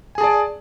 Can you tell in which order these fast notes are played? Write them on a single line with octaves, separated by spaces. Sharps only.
G#5 G#4 A5 D5